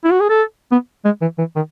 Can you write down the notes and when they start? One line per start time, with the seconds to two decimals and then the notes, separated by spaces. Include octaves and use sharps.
0.04 E4
0.12 F#4
0.20 G#4
0.29 A4
0.72 B3
1.05 G#3
1.21 E3
1.38 E3
1.56 D#3